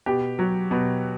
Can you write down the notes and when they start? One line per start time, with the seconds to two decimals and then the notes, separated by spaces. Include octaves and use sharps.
0.06 B2 G4
0.39 F#3
0.71 B2